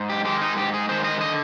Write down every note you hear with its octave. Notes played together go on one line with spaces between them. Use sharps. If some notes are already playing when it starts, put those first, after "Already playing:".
Already playing: G#2
G4
D#3 G#3 G4
D#4
G#2 G4
G#4
D#3 G#3 C5
D#5
D3 D#5